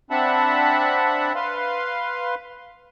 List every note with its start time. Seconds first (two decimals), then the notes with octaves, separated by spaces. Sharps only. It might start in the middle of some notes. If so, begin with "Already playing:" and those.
0.11 C4 D4 E5 F#5 A5 B5
1.35 B4 F5 C6